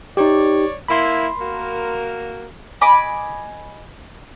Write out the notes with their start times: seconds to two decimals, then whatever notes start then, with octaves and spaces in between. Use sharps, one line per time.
0.17 D#4 G4 C#5 D5
0.88 A#3 E4 B5 C6
1.39 A#3 F#4 A#4
2.81 D#5 G#5 B5 D6